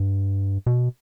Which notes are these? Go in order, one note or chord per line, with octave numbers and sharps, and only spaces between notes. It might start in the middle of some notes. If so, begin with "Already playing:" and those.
Already playing: G2
B2